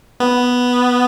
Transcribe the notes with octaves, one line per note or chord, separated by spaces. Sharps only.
B3